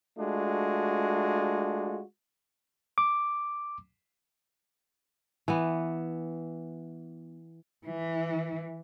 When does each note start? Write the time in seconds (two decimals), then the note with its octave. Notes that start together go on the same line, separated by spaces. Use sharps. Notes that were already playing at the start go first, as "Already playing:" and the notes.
0.18 G#3 A3 D4 F4 F#4
2.98 D6
5.48 E3 B3
7.87 E3